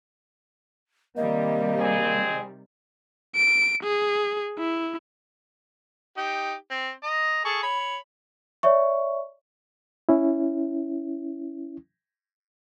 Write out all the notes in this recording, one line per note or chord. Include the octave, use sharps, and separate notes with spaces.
C3 D#3 G3 A#3 D#5
C4 G#4
D7
G#4
E4
D#4 G4
C4
D#5 A#5
G#4 A4 C#6
C#5 B5
C#5 D5 E5 C#6
C#4 E4